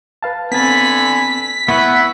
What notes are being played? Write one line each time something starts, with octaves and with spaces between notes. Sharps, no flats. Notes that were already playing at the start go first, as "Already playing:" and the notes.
B4 F5 A5
D3 B3 C4 G#5 B5 A6 B6
B3 E4 B4 E5 F#5 C#6